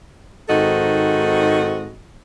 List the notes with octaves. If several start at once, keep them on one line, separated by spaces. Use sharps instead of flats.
G#2 D#3 C4 F#4 A4 D#5